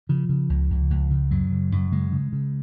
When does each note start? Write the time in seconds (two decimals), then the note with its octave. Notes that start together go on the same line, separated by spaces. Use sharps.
0.09 C#3 F3
0.29 C#3
0.50 C#2
0.70 C#2
0.90 C#2
1.11 C#3
1.31 F#2 F#3
1.51 C#3
1.72 F#2
1.92 C#3 G#3
2.12 C#3
2.33 C#3